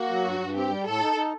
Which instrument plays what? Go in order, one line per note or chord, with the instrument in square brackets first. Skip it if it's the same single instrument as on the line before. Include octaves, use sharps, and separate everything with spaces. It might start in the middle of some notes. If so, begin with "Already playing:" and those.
Already playing: [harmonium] A#3 [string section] F#4
[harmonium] F#3
G2
G2
[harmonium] C4 [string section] G4
[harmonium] G3
[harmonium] A2 [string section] A4
[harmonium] D#4
D#4